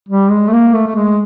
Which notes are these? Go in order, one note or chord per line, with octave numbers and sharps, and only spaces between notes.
G3
G#3
A3
A#3
A3
A3
G#3